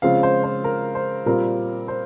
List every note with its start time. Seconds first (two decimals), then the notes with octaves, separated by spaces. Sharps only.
0.02 C#3 F3 G#3 C4 F4 F5
0.23 C5
0.44 C5
0.64 A#4
0.95 C5
1.26 A#2 G3 C4 F4 A#4
1.88 C5